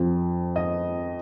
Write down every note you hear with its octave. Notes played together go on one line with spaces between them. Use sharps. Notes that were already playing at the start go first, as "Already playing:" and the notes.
Already playing: F2 F3
D#5